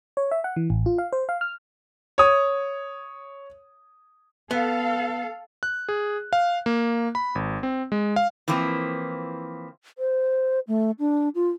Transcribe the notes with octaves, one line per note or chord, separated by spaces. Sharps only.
C#5
E5
F#5
E3
A1
F4
F5
C5
F5
F6
C#5 D#6
B3 A4 F5
F#6
G#4
F5
A#3
B5
G#1
C4
G#3
F5
E3 F3 A#3 C4
C5
A3
D4
F4